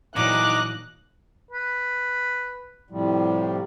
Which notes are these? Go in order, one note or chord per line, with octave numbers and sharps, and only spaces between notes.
A#2 E3 F#3 D#4 C#5 D6 F#6
B4
A2 C3 F3 G3